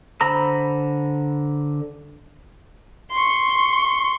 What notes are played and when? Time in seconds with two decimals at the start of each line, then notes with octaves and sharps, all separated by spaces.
0.21 D3 C5 A#5 B5 E6
3.11 C6 C#6